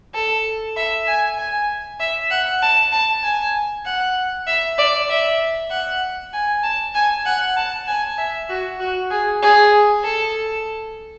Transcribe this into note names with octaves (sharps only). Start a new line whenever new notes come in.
A4
E5
G#5
G#5
E5
F#5
A5
A5
G#5
F#5
E5
D5
E5
F#5
G#5
A5
G#5
F#5
A5
G#5
E5
F#4
F#4
G#4
G#4
A4